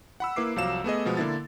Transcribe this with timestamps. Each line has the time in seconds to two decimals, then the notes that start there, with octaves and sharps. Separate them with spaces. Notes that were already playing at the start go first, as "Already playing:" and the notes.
0.20 F#5 B5 E6
0.36 A#3 E4 B4 D6 C7
0.56 C2 F3 F#3 F5 E6 E7
0.84 A3 B3 G#4 D#5
1.05 B2 F3 G#3 B3
1.17 D3 A#3 E4 A6